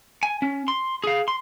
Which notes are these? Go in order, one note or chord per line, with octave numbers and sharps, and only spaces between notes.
G#5
C#4
C6
G#4 F5
C6